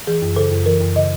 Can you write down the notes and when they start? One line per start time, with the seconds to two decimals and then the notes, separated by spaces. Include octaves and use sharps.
0.07 E3 G#4
0.22 F#2
0.36 C#3 A4
0.51 F#2
0.66 E3 A#4
0.80 F#2
0.95 C#3 D#5